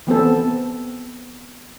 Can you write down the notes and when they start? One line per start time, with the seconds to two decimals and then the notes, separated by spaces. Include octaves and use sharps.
0.07 E3 B3 C4 A4